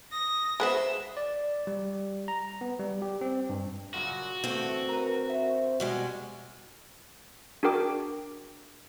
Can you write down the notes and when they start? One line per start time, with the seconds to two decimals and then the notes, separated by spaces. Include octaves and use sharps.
0.12 D#6 A#6
0.60 G#3 B3 F#4 C5 E5
1.17 D5
1.67 G3
2.28 A#5
2.61 B3
2.79 G3
3.02 G4
3.21 C4
3.50 G2
3.94 F#2 A#2 C#3 F#4
4.44 G2 D3 E3 A3 C4
4.89 A#4 B4 A#5
5.30 C5 E5
5.80 B2 G3 G#3 F#4
7.63 D4 F#4 G#4 A#4 G5 D6